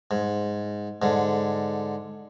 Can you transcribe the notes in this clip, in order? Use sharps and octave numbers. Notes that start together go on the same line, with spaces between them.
G#2
G#2 D3